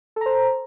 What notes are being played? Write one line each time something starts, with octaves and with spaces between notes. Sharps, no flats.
A4 C5 A#5